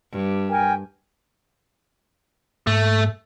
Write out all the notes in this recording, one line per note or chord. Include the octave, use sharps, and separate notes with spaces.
G2
A#4 G5 G#5
G#2 A3